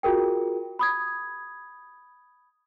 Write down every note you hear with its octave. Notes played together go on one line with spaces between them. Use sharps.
F4 F#4 G#4 A#4 G5
B5 D#6 G#6